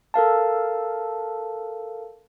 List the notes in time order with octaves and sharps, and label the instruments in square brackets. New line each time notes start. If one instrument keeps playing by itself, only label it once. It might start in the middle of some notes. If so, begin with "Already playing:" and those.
[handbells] A4 A#4 F5 A5